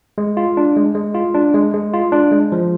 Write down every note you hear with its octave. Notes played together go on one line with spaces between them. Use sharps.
G#3
F4
D4
G#3
G#3
F4
D4
G#3
G#3
F4
D4
G#3
F3